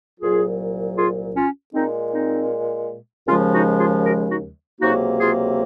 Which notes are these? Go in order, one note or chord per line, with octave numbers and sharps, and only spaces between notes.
C2 A#2 F#3 F4 G#4
F4 G#4
C#4 F4
A#2 G#3 C4 D#4
C4 D#4
D#2 C#3 F3 G#3 C#4 F4
D#4 F#4
F4 G#4
F#4 A#4
D#4 F#4
C#2 C3 F#3 A#3 D#4 F#4
F4 G#4